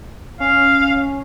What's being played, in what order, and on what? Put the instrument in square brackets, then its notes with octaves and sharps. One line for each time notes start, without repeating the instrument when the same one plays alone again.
[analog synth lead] C#4 [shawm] F5